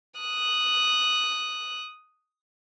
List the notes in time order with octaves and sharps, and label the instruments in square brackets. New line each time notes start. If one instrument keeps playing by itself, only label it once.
[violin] D#6 F#6